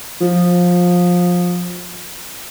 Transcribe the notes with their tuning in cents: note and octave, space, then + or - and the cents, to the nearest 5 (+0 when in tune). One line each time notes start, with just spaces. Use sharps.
F3 +20